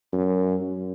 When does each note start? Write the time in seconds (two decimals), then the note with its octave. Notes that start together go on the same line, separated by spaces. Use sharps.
0.13 F#2
0.61 F#2